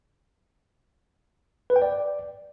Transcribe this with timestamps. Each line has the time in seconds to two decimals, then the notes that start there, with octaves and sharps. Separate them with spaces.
1.70 B4
1.76 G5
1.82 D5